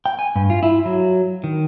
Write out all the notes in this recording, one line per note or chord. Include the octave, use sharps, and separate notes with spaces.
G5
G#5
G2
F4
E4
F#3
D#3